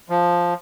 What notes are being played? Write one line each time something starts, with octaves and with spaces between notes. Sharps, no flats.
F3